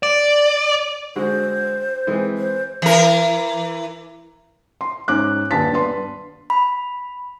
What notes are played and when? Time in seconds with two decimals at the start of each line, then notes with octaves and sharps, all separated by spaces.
0.03 D5
1.16 D3 G#3 F#4 C5
2.07 E3 G#3 C4
2.37 C5
2.82 E3 A#4
4.81 C6
5.08 G#2 C#4 D6 F#6
5.51 D#1 G2 A5 A6 B6
5.72 G2 B3 B4 C6
6.50 B5